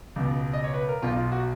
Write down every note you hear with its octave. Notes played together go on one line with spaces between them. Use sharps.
C#2 B2
D#5
C#5
B4
A#4
B1 B2 F4
F4
F#4